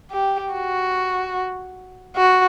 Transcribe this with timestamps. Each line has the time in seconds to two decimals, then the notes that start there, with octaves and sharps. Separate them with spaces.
0.11 G4
0.53 F#4
2.16 F#4